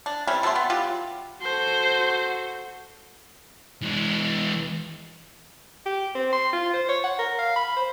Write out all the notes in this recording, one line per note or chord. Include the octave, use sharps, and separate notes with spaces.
D4
E3 G3 C4 C#4
B2 A3 G4 C6
B3
F#3 F4 G4
F#4 A4 C5
E3 G#3
G4
C4
C6
F4
C5
C#5
F#5
A#4
F5
B5
C5